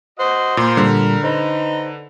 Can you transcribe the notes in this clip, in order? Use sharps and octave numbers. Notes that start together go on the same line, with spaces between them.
F#4 C5 D#5 F#5
A#2 A#4 B5
A#2 D3 G3
D#4 B4 C5